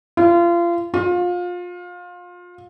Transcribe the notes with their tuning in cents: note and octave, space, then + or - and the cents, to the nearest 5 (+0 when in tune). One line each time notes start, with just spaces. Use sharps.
F4 -30
F4 +25